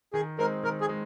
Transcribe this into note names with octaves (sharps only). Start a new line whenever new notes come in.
D#3 G#4
G#3 C4 D#4 A#4
D#3 A#4
G#4
G#3